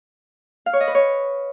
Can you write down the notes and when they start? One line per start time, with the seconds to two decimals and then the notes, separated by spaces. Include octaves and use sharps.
0.66 F5
0.73 C#5
0.80 D#5
0.88 B4
0.95 C#5